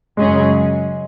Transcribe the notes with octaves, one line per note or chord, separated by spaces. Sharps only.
F#2 C#3 F#3 G#3 C#4 G#4